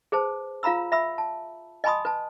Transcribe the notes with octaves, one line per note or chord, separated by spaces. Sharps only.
G#4 B4 C5 A5
F4 F5 A#5 B5 E6
E5 B5 E6
A5
D#5 G#5 A5 B5 C6 D#6
B4 A5